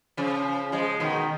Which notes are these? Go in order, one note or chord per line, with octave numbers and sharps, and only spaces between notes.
C#3 F3
F3 G#3
B2 D#3